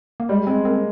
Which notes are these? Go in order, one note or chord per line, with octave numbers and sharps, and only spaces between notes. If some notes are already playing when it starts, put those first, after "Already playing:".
A#3
G3 G#3
G#3 C4
A#3 C4